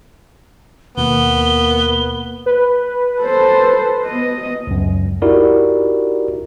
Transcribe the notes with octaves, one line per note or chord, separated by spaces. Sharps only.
D#2 B2 A#3 B3 G7
B4
A4 C5
B3 D#5
C#2 F#2
D#4 E4 F#4 G4 A#4 D5